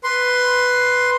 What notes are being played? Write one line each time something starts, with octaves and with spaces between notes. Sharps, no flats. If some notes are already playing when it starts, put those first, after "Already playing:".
B4 C6